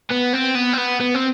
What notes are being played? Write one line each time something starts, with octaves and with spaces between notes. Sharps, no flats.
B3
C4
B3
C4
B3
B3
C4